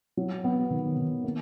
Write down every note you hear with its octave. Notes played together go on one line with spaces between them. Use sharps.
F#3
B3
D#3
D#3
A#3